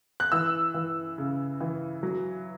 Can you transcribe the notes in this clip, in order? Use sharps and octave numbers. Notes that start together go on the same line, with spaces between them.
F#6
E3 E6
E3
C#3
E3
F#3